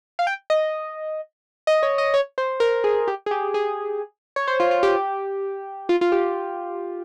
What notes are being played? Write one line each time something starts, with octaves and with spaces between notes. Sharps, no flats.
F5
G5
D#5
D#5
C#5
D#5
C#5
C5
A#4
G#4
G4
G#4
G4
G#4
C#5
C5
F4
F4
G4
F4
F4
G4